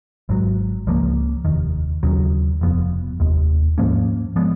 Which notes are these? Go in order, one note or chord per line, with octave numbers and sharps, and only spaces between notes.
G#1 G#2 F#3
C#2 C#3 F3 A#3
F1 D#2 D#3
D#2 C#3 F#3
F1 F2 F3 B3
F1 D#2 D#3
G#2 F3 A#3 C#4
F3 G#3 B3